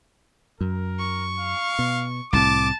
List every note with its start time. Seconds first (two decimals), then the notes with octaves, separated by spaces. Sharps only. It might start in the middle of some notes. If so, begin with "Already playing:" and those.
0.61 F#2 A#4
0.99 C#6
1.39 F5
1.79 B2
2.33 C2 A2 C3 A5 D6